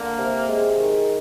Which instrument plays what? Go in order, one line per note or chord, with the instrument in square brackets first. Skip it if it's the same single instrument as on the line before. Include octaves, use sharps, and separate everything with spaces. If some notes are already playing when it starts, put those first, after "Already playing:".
Already playing: [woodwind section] D3 A#3
C3
G#3
D#3